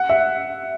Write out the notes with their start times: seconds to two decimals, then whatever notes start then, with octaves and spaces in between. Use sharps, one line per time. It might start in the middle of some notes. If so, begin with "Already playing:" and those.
Already playing: F#5
0.09 E5